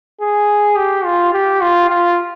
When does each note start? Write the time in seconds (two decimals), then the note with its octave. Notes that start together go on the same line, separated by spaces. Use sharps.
0.21 G#4
0.76 G4
1.05 F4
1.33 G4
1.61 F4
1.89 F4